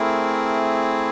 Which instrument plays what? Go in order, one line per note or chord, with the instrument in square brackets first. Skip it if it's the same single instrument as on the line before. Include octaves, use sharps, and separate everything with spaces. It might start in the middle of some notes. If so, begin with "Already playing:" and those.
Already playing: [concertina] A3 C4 E4 G#4 A#4